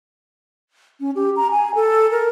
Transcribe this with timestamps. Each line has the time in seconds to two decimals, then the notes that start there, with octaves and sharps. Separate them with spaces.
1.01 C#4
1.15 G4
1.36 A#5
1.51 G#5
1.75 A4
2.11 A#4